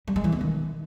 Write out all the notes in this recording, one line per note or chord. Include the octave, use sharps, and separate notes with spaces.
G3
G#3
E3
B3
D#3